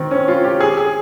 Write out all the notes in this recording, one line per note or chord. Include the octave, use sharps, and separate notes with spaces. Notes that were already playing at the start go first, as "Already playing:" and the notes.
Already playing: D#3 C4
C#4
F4
G4
G#4
G#4